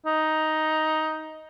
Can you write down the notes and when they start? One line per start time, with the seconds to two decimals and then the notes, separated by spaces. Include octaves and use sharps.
0.06 D#4